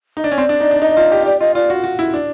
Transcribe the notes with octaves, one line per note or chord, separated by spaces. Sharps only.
D#4
D4
C#4
C4 D5
D4
D#4
D4
D#4 D#5
F4
G4
G4 D5
F4 D#5
F4 D5
F#4
F#4
E4
D4